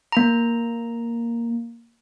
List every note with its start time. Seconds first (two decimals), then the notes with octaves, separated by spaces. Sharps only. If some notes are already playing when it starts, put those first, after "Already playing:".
0.12 A#3 A#5